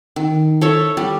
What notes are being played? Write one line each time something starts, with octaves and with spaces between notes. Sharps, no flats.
D#3
A4 C#5 E5
G3